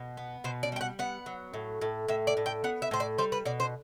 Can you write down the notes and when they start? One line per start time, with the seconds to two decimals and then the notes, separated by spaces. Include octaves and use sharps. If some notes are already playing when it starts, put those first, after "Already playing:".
Already playing: B2
0.17 B3
0.44 B2 C5
0.63 D5
0.72 G3 G5
0.81 F#5
0.99 B3 F#5
1.26 F#3
1.54 A2
1.81 A2
2.08 A2 E5
2.27 D5
2.37 A2
2.46 G5
2.64 B3 F#5
2.82 E5
2.91 A2 C5
3.00 D5
3.18 G3 C5
3.32 B4
3.46 B2 D5
3.60 C5